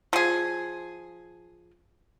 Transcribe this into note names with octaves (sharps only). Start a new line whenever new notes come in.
F3 G#4